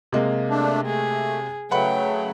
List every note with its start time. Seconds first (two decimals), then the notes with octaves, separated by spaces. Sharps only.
0.13 C3 G#3 A#3
0.50 A3 D4
0.86 A3 G#4
1.71 C#3 F#3 A3 B4 F#5 G5 B5